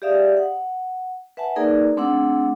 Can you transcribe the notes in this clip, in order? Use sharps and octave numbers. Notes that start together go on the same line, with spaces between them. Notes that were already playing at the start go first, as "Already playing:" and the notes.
G4 G#4 D5 E5 F5 D#6
F#5
B4 E5 F#5 G#5 A5
A#3 D#4 G#4 A#4 B4 D5
A3 C4 D4 G#4 F#5 E6